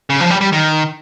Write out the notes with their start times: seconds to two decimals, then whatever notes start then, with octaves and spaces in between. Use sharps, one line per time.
0.10 C#3
0.20 F3
0.30 G3
0.41 G3
0.52 D#3